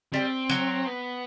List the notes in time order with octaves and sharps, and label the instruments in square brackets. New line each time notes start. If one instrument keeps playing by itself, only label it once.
[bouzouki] G3 [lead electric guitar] C4
[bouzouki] F#3
[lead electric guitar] B3